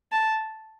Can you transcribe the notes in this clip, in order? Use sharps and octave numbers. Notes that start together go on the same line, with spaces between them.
A5